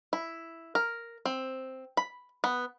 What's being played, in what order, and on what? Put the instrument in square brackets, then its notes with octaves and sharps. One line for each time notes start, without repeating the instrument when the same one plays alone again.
[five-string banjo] E4
A#4
C4
B5
B3